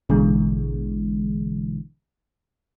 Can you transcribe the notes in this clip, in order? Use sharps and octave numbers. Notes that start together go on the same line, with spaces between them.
A1 B2 D3 E3 G#3